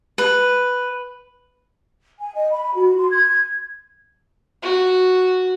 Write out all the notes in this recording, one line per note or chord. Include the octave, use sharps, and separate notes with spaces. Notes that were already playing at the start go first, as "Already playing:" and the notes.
B4
G#5
D#5
B5
F#4
C6
G#6
F#4